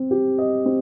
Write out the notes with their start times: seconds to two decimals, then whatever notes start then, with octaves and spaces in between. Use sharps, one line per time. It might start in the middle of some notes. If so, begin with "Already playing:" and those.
Already playing: C4
0.11 G4
0.38 D#5
0.66 C4